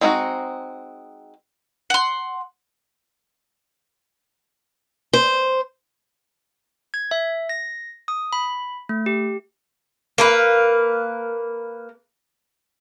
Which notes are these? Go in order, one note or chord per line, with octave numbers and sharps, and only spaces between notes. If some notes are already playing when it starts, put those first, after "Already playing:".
G#3 C4 D#4 F4 F#4
F#5 C6
C5
G#6
E5
A#6
D#6
B5
A3
G4
A#3 A#4 B4